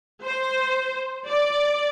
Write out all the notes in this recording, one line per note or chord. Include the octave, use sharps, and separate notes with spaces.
C5
D5